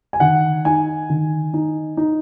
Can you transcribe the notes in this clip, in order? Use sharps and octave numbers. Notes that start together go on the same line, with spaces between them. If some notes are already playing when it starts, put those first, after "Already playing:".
G#5
D#3 F#5
D#4 G#5
D#3
D#4
D#4